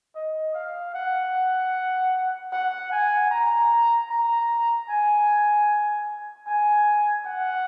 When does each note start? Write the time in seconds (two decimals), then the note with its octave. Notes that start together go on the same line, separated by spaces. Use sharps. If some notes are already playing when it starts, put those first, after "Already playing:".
0.15 D#5
0.54 F5
0.94 F#5
2.52 F#5
2.91 G#5
3.31 A#5
4.10 A#5
4.89 G#5
6.47 G#5
7.26 F#5